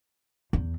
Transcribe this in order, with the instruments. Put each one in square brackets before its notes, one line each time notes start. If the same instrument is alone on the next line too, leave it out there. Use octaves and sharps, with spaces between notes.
[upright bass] E2